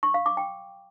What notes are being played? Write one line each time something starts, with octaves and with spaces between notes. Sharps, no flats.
C#6
F5
D6
G5